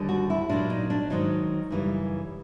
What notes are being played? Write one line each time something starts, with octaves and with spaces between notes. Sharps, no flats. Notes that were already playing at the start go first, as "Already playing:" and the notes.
Already playing: D#2 D3 G3
F#4
E4
A#2 F#3 D4
D#4
D4
G#2 D#3 F#3 D#4
F#2 C#3 E3 G3